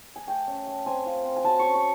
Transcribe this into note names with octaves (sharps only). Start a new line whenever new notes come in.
G#5
A3 G5
C#4
A3
C4 G#5
F4
C4
G#5
F#3 A5
C#4 C#6
C#6